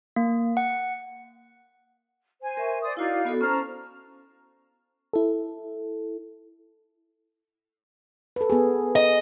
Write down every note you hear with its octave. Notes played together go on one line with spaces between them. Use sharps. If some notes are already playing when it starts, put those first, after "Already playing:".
A#3
F#5
C5 G#5
A#4 E5 C#6
C5 D5 D#6
D#4 E4 F#4 D5 F5
B3 F#4 A4
C#4 C5 A5 A#5 C#6 F6
E4 A4
A4 B4
B3 G#4
D#5